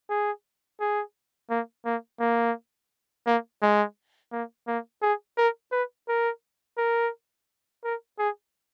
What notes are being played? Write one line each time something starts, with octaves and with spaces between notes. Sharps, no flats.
G#4
G#4
A#3
A#3
A#3
A#3
G#3
A#3
A#3
G#4
A#4
B4
A#4
A#4
A#4
G#4